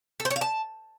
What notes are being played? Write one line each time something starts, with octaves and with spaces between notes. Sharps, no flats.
A4
C5
C#5
F5
A5